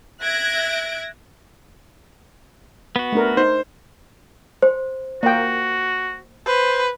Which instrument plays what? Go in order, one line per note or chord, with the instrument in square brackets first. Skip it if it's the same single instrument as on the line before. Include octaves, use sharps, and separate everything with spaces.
[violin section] E5 F#6 G#6 A#6 D7
[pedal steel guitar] B3 F#4
[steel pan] A3 D4 A#4
[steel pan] D#4 [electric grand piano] C5
[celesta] C5
[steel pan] A#3 G5 [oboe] F#4
[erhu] B4 [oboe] C5